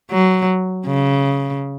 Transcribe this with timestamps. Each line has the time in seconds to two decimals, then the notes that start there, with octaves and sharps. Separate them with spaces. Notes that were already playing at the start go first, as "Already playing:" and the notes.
0.11 F#3
0.87 C#3